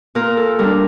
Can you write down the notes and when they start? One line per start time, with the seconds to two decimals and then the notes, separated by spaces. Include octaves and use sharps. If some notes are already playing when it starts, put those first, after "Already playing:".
0.15 A#2 A#4
0.37 A4
0.59 G3 D4 A#4